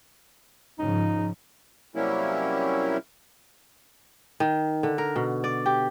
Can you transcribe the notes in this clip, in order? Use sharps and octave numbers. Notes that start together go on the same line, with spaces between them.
G#2 C#3 F3 D#4
C3 F#3 G3 A#3 C#4 E4
D#3
D3
A#4
B2
D5
G4